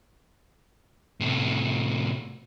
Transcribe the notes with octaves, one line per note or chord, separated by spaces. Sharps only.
A2 C3